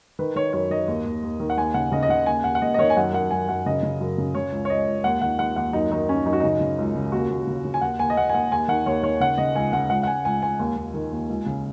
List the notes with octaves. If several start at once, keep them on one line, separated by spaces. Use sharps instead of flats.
D#3 B4
D#3 C#5
F#2 C#5
D#3 D#5
D#2
D#2
D#2
D#3
F#5
D#2 G#5
C#3 F#5
C#3 D#5
D#5
C#3 F#5
D#2 G#5
D#2 F#5
F#5
D#2 D#5
D#5
D#3 C#5
G#5
F#2 F#5
F#2 F#5
F#2 G#5
F#2 F#5
C#3 D#5
C#3
F#2
C#3
C#3 C#5
C#2
C#5
C#2 D#5
C#2
D#2 F#5
D#3 F#5
D#2 F#5
D#2 F#5
F#2 D#4
D#3 D#4
D#3 C#4
F#2 D#4
F#4
C#3 D#4
C#3
C#2
C#3
D#2 F#4
D#2
C#3
C#3
G#5
D#2 F#5
D#2 G#5
D#5
D#2 F#5
G#5
D#2 F#5
D#2 G#5
D#3 F#5
D#2 C#5
D#3 C#5
C#3 F#5
C#3 D#5
C#2 G#5
C#3 F#5
C#2 F#5
F#5
C#2 G#5
C#2 G#5
C#2 G#5
D#2
D#2
D#3
D#2
C#2
C#3